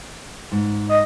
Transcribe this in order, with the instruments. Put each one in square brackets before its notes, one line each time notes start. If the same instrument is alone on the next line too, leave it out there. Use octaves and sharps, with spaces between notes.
[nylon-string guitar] G#2
[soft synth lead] D#5